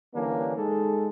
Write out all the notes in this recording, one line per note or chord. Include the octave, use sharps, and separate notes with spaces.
D3 E3 G3 A#3 C#4 D4
G#3 D#4 A4